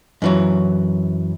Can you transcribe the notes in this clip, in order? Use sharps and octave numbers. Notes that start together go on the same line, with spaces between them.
F#2 E3 F#3